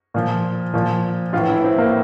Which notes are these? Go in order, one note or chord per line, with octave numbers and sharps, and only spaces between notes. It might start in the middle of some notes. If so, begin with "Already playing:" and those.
A#2 F3
A#2 F3
A2 E3 F4
E4
C4
A#3